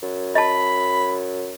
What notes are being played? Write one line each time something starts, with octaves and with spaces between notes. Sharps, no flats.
F#2
D#5 A5 B5